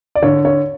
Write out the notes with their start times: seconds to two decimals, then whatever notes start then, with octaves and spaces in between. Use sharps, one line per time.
0.15 D5
0.22 D3 C#5
0.45 C#5